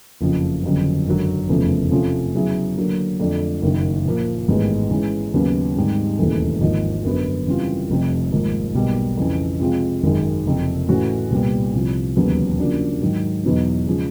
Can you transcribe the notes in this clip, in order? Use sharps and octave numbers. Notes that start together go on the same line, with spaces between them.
F#1 F2 C#3 F3
G1 F2 C#3 F#3
G#1 F#2 D3 F#3
F1 E2 C#3 F3 A3
C3 F3 A3 C#4 F4
C#3 F#3 B3 E4 G#4
D3 F#3 A#3
F2 D3 F3 A3 D4
F#1 F#2 D#3
A#2 F3 A#3
A1 G#2 D#3 G#3 B3
G#2 E3 G#3 C#4
D#2 C#3 F#3 B3
G#2 D#3 G3 C4 D#4
E1 D#2 C#3 E3 A3
G#1 G#2 F3 A#3 D#4
G1 F#2 D3 F#3 B3
C#3 E3 G3 C4 F4
F1 F2 C3
G#1 G#2 F3 A#3
B1 B2 G3 A#3
F2 C#3 E3
C3 F3 G#3 C4 F4
G#1 F#2 D#3 G#3
F#1 F2 C3
A2 E3 A3 C#4 F#4
C2 A#2 G3 B3
C2 C3 F3
E1 D#2 C#3 F#3 B3
C#3 F3 A#3 D4 F#4
G#2 D#3 F#3
E2 B2 F#3 B3 D#4
C#3 F3 G#3